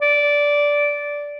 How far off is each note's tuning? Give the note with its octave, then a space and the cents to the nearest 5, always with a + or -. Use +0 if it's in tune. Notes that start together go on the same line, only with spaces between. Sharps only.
D5 -10